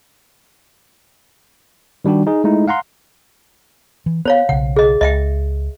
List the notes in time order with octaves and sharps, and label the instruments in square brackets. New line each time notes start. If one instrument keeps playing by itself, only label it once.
[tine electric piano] D#3 G3 D4 F#4 G4
D#4 G#4
G#3 A3 D#4 E4
F5 F#5 A#5 C6
[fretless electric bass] E3
[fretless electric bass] B3 [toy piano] C5 C#5 F5
[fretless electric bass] B1 C#3 [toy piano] F#5
[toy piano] G#4 D#5
[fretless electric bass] C#2 [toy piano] D#5 E5 G5